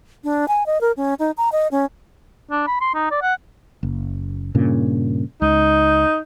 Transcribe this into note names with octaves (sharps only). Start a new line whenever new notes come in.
D4
G#5
D#5
A#4
C#4
D#4
A#5
D#5
C#4
D4
B5
C6
D#4
D5
F#5
F#1
G2 A#2 C#3
C#2 D#4